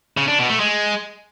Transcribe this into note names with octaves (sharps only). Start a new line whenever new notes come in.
C#3
D4
B2
A3
G#3